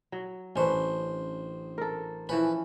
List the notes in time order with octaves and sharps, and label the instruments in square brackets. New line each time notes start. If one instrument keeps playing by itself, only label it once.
[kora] F#3
[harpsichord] A1 C5 [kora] C#4 D4 B4
[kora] A4 A#4
[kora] E3 F3 C#4 [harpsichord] B4